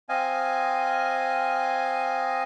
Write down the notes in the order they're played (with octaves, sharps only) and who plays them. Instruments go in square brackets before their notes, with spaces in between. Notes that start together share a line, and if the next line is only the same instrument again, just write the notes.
[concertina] C4 D#5 F5 G#5